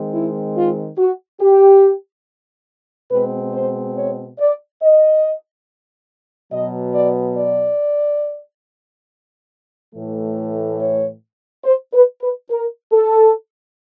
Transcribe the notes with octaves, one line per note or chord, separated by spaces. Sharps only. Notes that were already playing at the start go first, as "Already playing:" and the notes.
Already playing: D#3 G#3 C4
E4
F4
F#4
G4
B2 G#3 C4 B4
C5
C#5
D5
D#5
B2 F#3 B3 D#5
D5
D5
A2 E3 A3
C#5
C5
B4
B4
A#4
A4